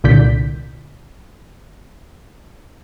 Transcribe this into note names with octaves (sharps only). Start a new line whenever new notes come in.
C2 A#2 D3 D5 G6 B6